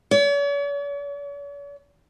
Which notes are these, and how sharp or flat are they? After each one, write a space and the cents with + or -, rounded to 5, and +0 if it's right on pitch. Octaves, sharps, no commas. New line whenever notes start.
C#5 +45